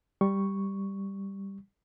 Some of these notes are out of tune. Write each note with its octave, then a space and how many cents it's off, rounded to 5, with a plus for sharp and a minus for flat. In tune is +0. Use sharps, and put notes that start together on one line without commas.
G3 +0 C#6 +0